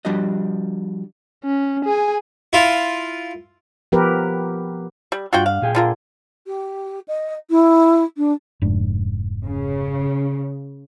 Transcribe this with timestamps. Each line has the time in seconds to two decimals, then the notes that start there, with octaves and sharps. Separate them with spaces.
0.05 F3 G3 D4 F#4 D#5
1.44 C#4
1.85 G#4 G#5
2.53 E4 F4
3.92 F3 B3 G4 A#4 B4
5.12 G3
5.33 G2 D4 F4 F#4 F#5 G5
5.46 F5
5.62 A#2 G#4 G5
5.75 D3 F4 A#4
6.47 G4
7.08 D#5
7.50 E4
8.17 D4
8.62 F1 G#2 D4
9.45 C#3